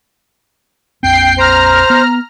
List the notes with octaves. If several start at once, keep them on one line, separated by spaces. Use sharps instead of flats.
A#1 F2 C4 G5 C7
C5 A#5 F6
B3